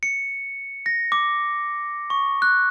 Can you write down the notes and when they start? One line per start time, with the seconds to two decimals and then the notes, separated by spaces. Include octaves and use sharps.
0.03 C#7
0.86 A#6
1.12 D6
2.10 C#6
2.42 F#6